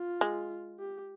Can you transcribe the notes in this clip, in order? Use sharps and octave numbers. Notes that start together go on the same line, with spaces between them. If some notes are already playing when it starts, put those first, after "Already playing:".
Already playing: F4
G#3
G4